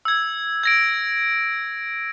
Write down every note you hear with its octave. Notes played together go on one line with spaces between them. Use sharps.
E6 G#6
G#6 A#6 D7